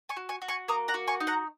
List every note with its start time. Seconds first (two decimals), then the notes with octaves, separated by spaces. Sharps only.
0.09 G#5 C#6
0.17 F#4
0.29 G#5 C#6
0.42 F#4
0.48 G#5 C#6
0.68 A#3 A#5 D#6
0.88 F#5 A#5
0.94 F#4
1.07 G#5 C#6
1.20 D#4
1.27 F#5 A#5